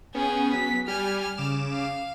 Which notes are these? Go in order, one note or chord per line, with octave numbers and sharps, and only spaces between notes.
B3 C#4 G#4 G5
F#3 B3 B6
G3 G4 G#5 F6
C#3 D6 E7
F5